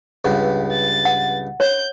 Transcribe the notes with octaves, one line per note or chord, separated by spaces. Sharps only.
C#2 G2 B3
A6
F#5
C#5 G6